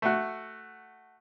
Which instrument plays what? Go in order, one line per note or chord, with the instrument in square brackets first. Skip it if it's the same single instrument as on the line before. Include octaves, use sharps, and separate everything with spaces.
[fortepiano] A3 F#4